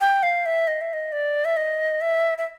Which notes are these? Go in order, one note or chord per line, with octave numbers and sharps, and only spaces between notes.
G5
F5
E5
D#5
E5
D#5
D5
E5
D#5
E5
E5